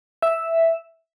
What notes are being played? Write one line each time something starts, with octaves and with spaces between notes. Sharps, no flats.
E5